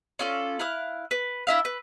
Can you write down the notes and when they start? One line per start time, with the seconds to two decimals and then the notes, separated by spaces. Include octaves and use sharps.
0.19 C#4 F4 A4 D5
0.59 E4 F5 F#6
1.11 B4
1.47 D4 E4 E5 F5
1.65 B4